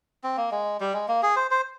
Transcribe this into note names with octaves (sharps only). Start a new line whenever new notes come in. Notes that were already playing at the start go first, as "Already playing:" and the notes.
C4
A#3
G#3
G3
G#3
A#3
G#4
C5
C5